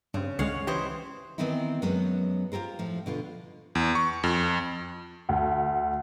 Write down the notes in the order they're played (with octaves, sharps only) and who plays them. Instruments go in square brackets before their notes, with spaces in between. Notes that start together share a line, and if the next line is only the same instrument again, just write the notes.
[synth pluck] G2 C4 [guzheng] C#3
[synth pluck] C#2 D3 G#3 [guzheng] C#5 F5 F#5
[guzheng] E3 C5 D#5 [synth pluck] G4
[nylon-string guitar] D#3 E3 B3 C4 D#4 E4
F#2 F#3 G#3 B3 C#4
F4 G4 A4 A#4 C5
A2 F3
B2 D3 F4
[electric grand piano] E2
C#6
F2
[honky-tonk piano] D2